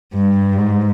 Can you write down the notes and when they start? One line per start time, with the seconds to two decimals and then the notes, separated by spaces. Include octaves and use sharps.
0.15 G2
0.58 G#2